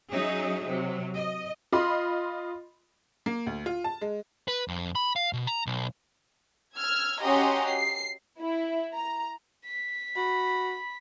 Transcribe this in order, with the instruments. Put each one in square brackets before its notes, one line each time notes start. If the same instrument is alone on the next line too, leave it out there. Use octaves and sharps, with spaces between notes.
[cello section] F#3 C#4 D#4 G#4 E5
C3 F#3
D#5
[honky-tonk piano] F4 D#5 B5 C6
A#3
D2
F4
A5
G#3
[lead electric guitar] B4
F2
B5
F5
B2
A#5
B1
[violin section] E6 F6 G#6
C#4 F#4 G4 D#5 A#5 C6
C7
[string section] E4
A#5
[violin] B6
[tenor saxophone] F#4 [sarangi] B5